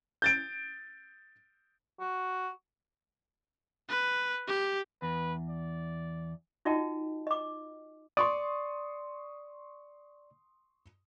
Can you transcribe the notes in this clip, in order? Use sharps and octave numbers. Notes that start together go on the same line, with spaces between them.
G6 A6 D7
F#4
B4
G4
E2 B4
D5
D#4 F4 F#4 D#5 G5 A5
D#5 D6
D5 C6 C#6 D#6